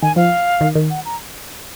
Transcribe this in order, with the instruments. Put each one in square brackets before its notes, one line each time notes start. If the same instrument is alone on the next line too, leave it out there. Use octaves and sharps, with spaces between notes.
[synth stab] D#3 [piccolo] G#5
[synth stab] F3 [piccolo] F5
[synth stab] D#3
D#3
[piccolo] F#5
A#5